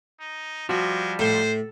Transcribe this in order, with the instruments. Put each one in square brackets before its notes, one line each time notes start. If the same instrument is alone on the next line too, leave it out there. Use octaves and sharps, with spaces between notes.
[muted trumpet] D#4
[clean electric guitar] F3 G3 [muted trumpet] G#3 [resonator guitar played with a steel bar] F#4
[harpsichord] A2 [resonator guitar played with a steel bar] A4 [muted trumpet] C5